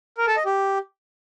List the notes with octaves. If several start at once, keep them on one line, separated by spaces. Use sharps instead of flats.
A#4
A4
D#5
G4